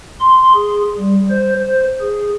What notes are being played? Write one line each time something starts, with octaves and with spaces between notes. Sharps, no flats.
C6
G#4
G3
C5
C5
G#4